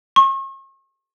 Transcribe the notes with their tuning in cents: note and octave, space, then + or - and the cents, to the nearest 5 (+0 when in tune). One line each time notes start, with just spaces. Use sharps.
C#6 -40